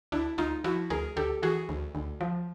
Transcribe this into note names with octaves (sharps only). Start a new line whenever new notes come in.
D2 D4 E4
D2 D#4 F4
F3 E4 F#4
D2 G#4 A#4
D2 G4 A4
E3 F#4 G#4
D2
D2
F3